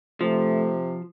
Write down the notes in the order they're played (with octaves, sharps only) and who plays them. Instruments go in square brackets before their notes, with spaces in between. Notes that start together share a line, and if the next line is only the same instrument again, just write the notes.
[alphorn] C3 [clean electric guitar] F3 [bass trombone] A3